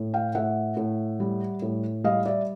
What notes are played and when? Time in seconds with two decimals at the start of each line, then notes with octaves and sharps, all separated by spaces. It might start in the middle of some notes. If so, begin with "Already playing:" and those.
Already playing: A2
0.14 F5 G5
0.35 A2 E5 F#5
0.77 A2
1.20 G3
1.62 A2
2.04 G3 D#5 F5
2.26 D5 E5